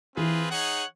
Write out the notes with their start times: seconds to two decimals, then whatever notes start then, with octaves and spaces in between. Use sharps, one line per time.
0.16 E3 C4 F4 G#4 B4
0.51 D#4 G#4 C#5 F#5